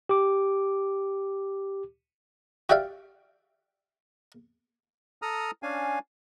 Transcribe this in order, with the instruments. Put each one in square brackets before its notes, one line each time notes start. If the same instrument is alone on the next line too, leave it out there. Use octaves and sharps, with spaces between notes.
[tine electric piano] G4 D6
[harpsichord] F#4 G4 D5 E5 F5
[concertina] A4 A#5 D#6 F6
C#4 D4 F5 G#5